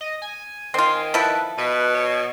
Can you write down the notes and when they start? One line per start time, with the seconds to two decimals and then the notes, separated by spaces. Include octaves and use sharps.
0.01 D#5
0.22 G#5
0.74 D#3 C4 F4
1.14 F3 E4 A4 B4
1.58 B2 B4
1.95 C#5